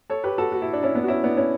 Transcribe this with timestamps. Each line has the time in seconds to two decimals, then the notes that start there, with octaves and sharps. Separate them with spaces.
0.10 A4 C#5
0.24 G4 B4
0.38 F#4 A4
0.52 F#4
0.62 E4
0.73 D4
0.83 C#4 E4
0.95 B3 D4
1.04 F#4
1.08 C#4 E4
1.23 B3 D4
1.37 C#4 E4